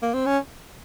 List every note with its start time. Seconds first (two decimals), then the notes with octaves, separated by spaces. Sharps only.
0.02 A#3
0.14 C4
0.26 C#4